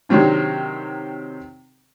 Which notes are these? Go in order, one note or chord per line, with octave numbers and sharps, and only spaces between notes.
C3 D#3 F#3 C4 D4